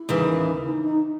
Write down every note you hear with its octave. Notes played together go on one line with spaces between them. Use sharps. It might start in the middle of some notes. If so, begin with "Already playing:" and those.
Already playing: E4
D#2 C#3 E3
D#4
D#4